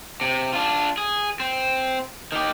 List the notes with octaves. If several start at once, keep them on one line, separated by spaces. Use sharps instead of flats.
C3
D4 F4
G#4
C4
D#3 G4